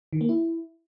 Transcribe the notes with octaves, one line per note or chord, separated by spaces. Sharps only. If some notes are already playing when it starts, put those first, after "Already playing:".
D#3
A#3
E4